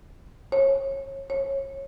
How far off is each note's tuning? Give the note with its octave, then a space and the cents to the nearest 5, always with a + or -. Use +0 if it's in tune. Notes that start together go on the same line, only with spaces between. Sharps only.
C#5 -30
C#5 -25